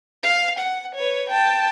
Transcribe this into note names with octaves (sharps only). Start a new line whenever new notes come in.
F5
F#5
B4 C#5
G5 A5